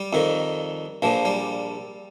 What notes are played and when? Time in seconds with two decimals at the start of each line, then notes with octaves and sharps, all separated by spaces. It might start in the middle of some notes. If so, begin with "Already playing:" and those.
Already playing: G3
0.13 F2 D#3
1.02 A#1 A#2 F3
1.25 G3